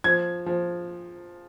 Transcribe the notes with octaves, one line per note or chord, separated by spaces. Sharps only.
F3 G#6
F3